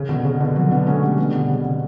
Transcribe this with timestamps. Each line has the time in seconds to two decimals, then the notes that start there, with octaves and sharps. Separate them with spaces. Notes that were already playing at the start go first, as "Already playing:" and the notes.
Already playing: C#3
0.09 B2 D3
0.25 C#3
0.40 B2 D3
0.56 D3 F#3
0.71 B3 D4
0.87 A3 C#4
1.03 G3 B3
1.18 G3 B3
1.34 B2 D3
1.49 C#3
1.65 C#3